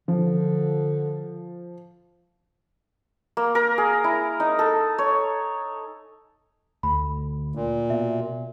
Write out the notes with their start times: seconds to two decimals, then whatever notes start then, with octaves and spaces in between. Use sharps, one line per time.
0.08 D3 F3
3.37 A#3
3.55 A#4
3.78 G#4
4.04 E4
4.40 D#4
4.59 A4
4.98 C#5
6.83 D2 B5
7.55 A#2
7.90 B2 E5